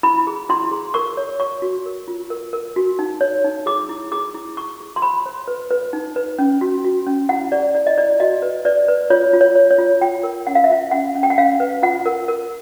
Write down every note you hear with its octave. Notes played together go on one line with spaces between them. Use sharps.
E4 B5
G#4
E4 C6
G#4
A#4 C#6
C#5
C#5 C#6
F#4
A#4
F4
A#4
A#4
F#4
D#4
C#5
D#4
G#4 D6
E4
G#4 D6
E4
E4 C#6
G#4
C6
C5 B5
C5
B4
B4
D#4
B4
C#4
F#4
F#4
C#4
E4 F#5
G4 D5
E4 D5
D#5
E4 D5
F#4 D#5
B4
B4 D5
B4
F4 C#5
F4
C#5
C#5
C#5
F4
F4 G5
A#4
C#4 F#5
F5
E5
F4 F5
C#4 F#5
C#4
G5
F#5
C#4 F5
B4
F4 F#5
A#4
A#4